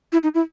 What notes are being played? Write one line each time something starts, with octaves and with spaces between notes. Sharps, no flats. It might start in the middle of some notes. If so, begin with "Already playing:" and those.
E4
D#4
E4